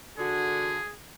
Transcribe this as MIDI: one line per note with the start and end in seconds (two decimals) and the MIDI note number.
0.18 0.78 50
0.18 0.78 66
0.18 0.94 68